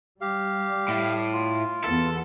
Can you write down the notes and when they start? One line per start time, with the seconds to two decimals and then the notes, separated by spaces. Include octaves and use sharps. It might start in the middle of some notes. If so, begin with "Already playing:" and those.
0.21 G3 G4 F5
0.88 A2
1.33 F4
1.84 E2 B3 A4